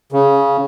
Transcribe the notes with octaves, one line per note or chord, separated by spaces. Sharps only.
C#3